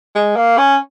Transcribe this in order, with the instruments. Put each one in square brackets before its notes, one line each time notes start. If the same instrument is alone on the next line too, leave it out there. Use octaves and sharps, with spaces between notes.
[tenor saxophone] G#3
A#3
C#4